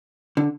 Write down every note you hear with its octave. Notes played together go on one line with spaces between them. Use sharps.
D3